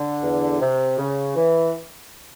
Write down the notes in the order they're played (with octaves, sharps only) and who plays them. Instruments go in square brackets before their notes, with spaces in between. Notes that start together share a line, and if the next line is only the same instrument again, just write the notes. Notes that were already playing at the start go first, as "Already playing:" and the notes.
Already playing: [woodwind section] D3
E2
C3
C#3
E3